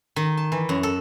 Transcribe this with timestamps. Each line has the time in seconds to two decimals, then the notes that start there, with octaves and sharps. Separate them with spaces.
0.16 D#3
0.37 A5
0.52 E3
0.69 F#2
0.83 A4